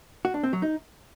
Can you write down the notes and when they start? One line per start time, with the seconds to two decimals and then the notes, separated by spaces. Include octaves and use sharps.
0.25 F#4
0.34 D4
0.43 C4
0.53 F#3
0.62 D#4